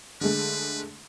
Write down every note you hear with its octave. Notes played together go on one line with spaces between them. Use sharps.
D3 G#3 A3 B4